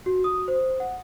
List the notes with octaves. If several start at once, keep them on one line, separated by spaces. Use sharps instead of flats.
F#4
D#6
C5
F#5